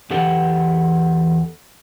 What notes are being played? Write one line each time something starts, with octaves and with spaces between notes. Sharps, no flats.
E2 E3 G4 A4 B4 F#5